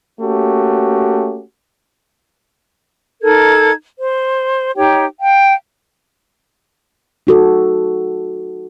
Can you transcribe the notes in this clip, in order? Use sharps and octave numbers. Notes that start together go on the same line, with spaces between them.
A3 A#3 C#4 F#4 G4
D#4 A4 A#4 G#6
C5
D#4 G4 C#5 G5
F5 G5
D#4 F#4 A4